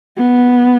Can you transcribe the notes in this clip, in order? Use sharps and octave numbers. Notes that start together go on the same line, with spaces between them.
B3